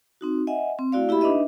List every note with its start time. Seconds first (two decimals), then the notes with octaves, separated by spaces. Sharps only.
0.21 C4 D#4 F#4
0.47 D#5 E5 F#5 G#5
0.79 C4
0.92 A3 E4 F#4 D5 F5
1.08 A#3 E4 G4 E5 B5
1.21 D4 D#4 B4 D#5 E5